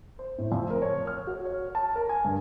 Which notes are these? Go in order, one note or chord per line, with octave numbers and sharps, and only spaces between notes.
C5
A2
F2
A#4
C#5
F6
F#4
C#5
A5
A#4
G#5
G2